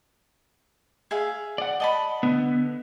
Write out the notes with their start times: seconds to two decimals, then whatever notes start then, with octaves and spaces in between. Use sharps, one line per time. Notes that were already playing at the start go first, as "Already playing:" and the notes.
1.11 G#4 E5 F5
1.58 D5 F#5
1.80 D#5 A5 B5
2.23 D3 B3